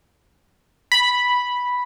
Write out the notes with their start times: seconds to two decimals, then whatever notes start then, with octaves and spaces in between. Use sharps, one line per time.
0.92 B5